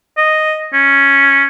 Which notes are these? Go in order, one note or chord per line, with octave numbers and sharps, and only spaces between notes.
D#5
C#4